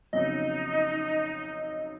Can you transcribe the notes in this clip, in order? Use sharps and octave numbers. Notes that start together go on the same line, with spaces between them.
B1 F2 C#3 D#4 D#5